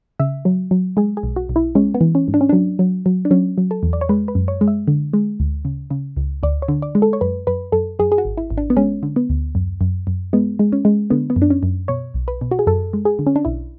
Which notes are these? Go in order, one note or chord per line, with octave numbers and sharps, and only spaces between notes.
C#3 E5
F#3
F#3
G#3 G#4
G#4
B1
F#4
B1
E4
G#3 C#4
B3
E3
C#4
G#2
D4
C#4
F#3 D4
F#3
F#3
D4
F#3 C#4
F#3
A4
E2
D5
C#5
G#3 B4
B4
F#2
C#5
G#3
E5
D3
G#3
D2
C#3
C#3
C#2
D2 D5
C#5
D3
D5
G#3
A4
C#5
F#2 B4
F#2 B4
F#2 A4
F#2 G#4
G#4
F#4
G#1
E4
G#1
D4
B3
G#3 C#4
D3
B3
D2
F#2
F#2
F#2
G#3 B3
G#3
C#4
G#3
D3 B3
B3
F#2
D4
C#4
F#2
B2 C#5
B1
B4
B2
F#4
G#4
F#2 A4
G#3
G#4
D3
C#4
D4
B1 E4